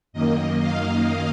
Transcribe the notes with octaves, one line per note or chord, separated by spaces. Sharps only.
F#2 D#3 A#3 D#5
F5